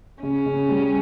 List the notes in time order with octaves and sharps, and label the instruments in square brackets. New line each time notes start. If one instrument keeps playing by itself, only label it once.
[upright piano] C#3 [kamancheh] C#4
[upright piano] C#3
G3